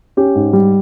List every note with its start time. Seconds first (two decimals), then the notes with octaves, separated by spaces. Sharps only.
0.17 C#4 G4
0.35 G#2
0.53 G3